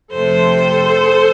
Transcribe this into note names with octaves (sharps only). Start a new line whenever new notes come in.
F2 C3 F3 A3 A4 C5